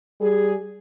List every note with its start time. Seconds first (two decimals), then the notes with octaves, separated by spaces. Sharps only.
0.21 G3 G#4